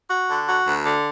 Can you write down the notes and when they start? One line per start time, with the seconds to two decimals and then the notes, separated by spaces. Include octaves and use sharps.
0.09 F#4
0.29 D3
0.47 F#4
0.66 D2
0.85 D3